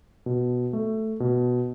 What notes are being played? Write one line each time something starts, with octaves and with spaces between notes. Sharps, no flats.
B2
A3
B2